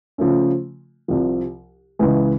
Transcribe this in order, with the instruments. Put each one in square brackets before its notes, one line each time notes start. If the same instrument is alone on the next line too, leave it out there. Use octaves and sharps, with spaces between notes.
[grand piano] C#3 F3 A3 C#4
C2 C3 F3
C#2 C#3 E3 G#3